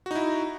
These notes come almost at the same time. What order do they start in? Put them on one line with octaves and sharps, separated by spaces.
F#4 D#4 E4